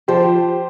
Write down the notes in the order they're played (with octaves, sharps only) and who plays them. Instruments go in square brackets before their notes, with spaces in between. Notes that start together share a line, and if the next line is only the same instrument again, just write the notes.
[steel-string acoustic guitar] F3 [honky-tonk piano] G4 C5